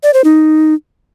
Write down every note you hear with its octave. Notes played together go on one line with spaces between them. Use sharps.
D5
C5
D#4